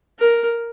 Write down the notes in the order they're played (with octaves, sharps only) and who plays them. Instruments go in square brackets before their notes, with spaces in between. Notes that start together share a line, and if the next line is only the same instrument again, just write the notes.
[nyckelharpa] A#4